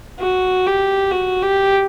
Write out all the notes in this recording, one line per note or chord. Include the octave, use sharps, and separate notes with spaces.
F#4
G4
F#4
G4